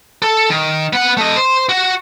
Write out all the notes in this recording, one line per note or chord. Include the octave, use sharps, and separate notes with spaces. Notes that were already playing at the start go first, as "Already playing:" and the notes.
A4
D#3
B3 F#5
A3 D#5
C5
F#4